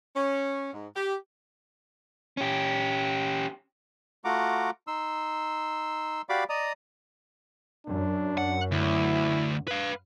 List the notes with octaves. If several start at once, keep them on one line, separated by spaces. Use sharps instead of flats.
C#4
G#2
G4
C#4 G4
A3 F4 F#4 F#5 A#5 D6
D#4 C6 E6
F#4 G4 D5 F5 B5 D6
D5 D#5 A#5 D#6
F#2 D4
F#5
D2 E4
B4 F5